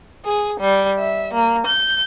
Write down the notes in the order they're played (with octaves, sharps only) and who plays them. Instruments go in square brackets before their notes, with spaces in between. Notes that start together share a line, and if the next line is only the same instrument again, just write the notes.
[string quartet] G#4
G3
E5
A#3
G6